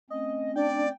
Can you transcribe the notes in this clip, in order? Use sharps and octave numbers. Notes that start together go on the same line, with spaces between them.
A3 C4 C#4 D#5
D4 D5 G5